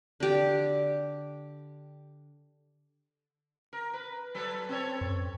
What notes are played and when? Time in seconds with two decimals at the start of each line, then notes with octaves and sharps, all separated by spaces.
0.20 D3 G4
3.73 A#4
3.93 B4
4.35 F#3 A4 B4
4.69 C4 A4 C#5
5.01 F#2